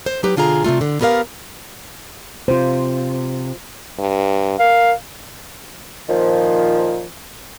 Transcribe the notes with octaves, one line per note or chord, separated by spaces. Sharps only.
C5
F#3 D#4 G4 B4
B2 D3 F4 G#4 A#5
C3 G3 A3 F4
D3
B3 G4 A#4 C5 F5
C3 F4 C5
G2
A#4 F5
A#2 D#3 F3